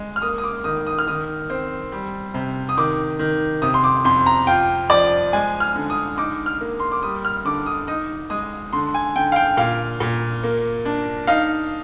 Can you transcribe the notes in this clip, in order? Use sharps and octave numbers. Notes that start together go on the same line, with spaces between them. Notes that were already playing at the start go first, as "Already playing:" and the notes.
Already playing: G#3
F6
A#3 D#6
D#6
D6
D#3 D#6
D#6
F6
D#3 D#6
C4
G3
C3
D#6
D#3 D6
D#3
C3 D#6
C6
D6
F2 C6
A#5
F4 G5
F3 D5
G#3 G#5
F6
D3
D#6
D#4 D6
F6
A#3
C6
D6
G3 D#6
F6
D3 D6
D#6
D#4 D#6
G#3 D#6
D3 C6
G#5
D3 G5
F5
G5
A#2 F5
A#2
A#3
D4
D#4 F5